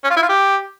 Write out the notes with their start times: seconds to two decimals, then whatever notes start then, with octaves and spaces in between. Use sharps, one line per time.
0.04 C#4
0.10 F4
0.17 E4
0.23 F4
0.29 G4